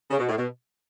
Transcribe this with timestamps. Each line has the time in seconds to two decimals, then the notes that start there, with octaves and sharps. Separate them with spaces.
0.11 C#3
0.19 B2
0.29 A2
0.37 B2